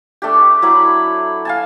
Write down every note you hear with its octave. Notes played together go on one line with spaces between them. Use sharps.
A3 D4 G4
F#3 E4 B5 D6
F5 G#5 A5